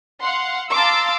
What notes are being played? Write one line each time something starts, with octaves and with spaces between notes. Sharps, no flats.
F5 F#5 C6
F5 A5 A#5 C6 D6 E6